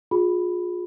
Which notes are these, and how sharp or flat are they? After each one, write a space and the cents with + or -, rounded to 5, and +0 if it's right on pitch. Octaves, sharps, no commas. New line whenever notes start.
F4 +35 G#4 +0 B5 +0